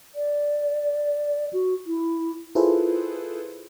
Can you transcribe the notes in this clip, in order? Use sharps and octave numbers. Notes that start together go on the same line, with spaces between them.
D5
F#4
E4
E4 F4 G#4 A4 B4 C5